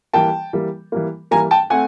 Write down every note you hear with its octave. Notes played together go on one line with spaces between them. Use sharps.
E3 G3 A#3 G5 A5
E3 G3 A#3
E3 G3 A#3
E3 G3 A#3 G#5 A#5
G5 A5
A3 C4 F#5 G#5